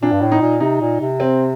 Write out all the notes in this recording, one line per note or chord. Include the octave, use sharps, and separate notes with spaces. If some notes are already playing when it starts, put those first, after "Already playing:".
A#2 D4
G2
A2
D#4
A#2
C3 D#4
A#2
C3
C4